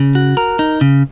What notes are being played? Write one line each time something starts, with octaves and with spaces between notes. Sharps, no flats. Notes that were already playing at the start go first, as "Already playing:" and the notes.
Already playing: C#3
F#4
A#4
D#4
C#3